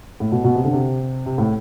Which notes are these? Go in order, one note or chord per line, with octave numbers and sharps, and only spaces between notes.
A2
B2
B2
C3
D3
C3
C3
A2